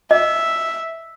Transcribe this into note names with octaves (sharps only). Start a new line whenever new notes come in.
D#5 E5